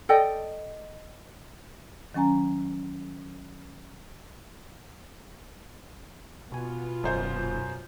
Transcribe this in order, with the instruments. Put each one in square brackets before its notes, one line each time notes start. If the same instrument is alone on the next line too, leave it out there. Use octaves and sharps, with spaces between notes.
[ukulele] A4 D5 D#5 G5
[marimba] D#3 F#3 C#4 G#5 A#5
[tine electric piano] B2 G#5 [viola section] B3 F4
[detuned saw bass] D#1 [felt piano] F#2 C5 G6